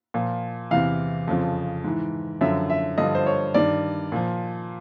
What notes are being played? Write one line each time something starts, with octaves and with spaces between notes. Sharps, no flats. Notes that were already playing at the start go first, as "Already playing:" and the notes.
A#2 F3
E2 C3 E3 F5
F2 C#3 F3
G#2 E3
F#2 D3 F3 E5
E5
G2 D3 F3 D#5
C5
C#5
G2 D#3 D5
A#2 F3